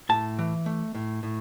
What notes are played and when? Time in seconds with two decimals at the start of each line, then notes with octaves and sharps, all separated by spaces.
0.09 A2 A5
0.39 E3
0.66 A3
0.95 A2
1.23 A2